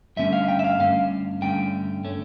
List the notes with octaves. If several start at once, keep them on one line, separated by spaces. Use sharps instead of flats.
G2 D3 A3 C#4 E5
F5
G5
E5
F5
G2 D3 A3 C#4 F5
G2 D3 A3 C#4 G5
D3 A3 C#4